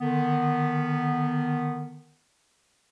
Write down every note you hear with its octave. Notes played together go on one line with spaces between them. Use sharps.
D3 D#3 B3